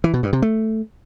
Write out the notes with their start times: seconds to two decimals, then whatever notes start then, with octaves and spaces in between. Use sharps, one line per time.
0.04 E3
0.14 B2
0.23 G2
0.33 C3
0.42 A3